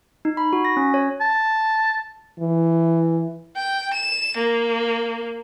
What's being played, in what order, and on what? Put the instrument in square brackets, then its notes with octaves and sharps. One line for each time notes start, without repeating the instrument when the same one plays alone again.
[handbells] D#4
B5
F#4
A#6
C#4
C#5
[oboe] A5
[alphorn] E3
[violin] G5
E7
A#3